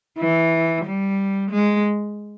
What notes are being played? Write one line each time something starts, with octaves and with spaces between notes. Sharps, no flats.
E3
G3
G#3